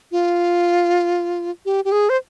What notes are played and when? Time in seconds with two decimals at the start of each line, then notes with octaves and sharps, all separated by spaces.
0.12 F4
1.65 G4
1.85 G4
1.92 G#4
2.09 C5